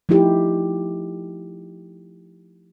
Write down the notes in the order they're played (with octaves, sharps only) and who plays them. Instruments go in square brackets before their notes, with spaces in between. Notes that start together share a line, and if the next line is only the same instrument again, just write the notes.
[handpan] F3 A3 D#4 E4 G4